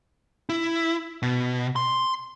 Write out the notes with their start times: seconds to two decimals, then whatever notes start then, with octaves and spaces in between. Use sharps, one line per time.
0.49 E4
1.22 B2
1.76 C6